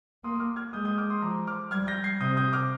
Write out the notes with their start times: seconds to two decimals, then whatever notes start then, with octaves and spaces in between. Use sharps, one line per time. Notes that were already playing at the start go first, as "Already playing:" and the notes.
0.24 A#3 C6 D#6
0.40 D6 F6
0.56 F6 G#6
0.73 G#3 D#6 G6
0.85 D#6 G6
0.98 D6 F6
1.10 C6 D#6
1.22 F3 A#5 D6
1.47 D6 F6
1.71 G3 F6 G#6
1.87 G6 A#6
2.04 G#6 C7
2.20 C3 D#6 G6
2.37 D#6 G6
2.53 D6 F6